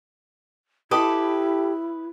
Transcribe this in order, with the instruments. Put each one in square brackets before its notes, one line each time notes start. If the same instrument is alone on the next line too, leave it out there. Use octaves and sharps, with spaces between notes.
[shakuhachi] E4 [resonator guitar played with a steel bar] G4 A4 [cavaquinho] B4 D#5 D6